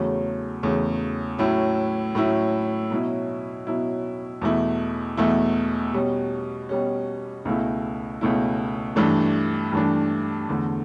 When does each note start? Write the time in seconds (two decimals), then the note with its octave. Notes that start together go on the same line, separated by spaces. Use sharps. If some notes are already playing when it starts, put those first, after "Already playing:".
Already playing: E2 C#3 F#3 A3 C#4
0.63 E2 C#3 F#3 A3 C#4
1.39 A2 F#3 C#4 E4
2.15 A2 F#3 C#4 E4
2.91 B2 F#3 C#4 E4
3.66 B2 F#3 C#4 E4
4.41 E2 B2 A3 E4
5.17 E2 B2 A3 E4
5.94 B2 G3 C#4
6.69 B2 G3 C#4
7.45 C#2 B2 A3 E4
8.21 C#2 B2 A3 E4
8.96 G2 E3 A3 D4
9.72 G2 E3 A3 D4
10.49 E2 D3 A3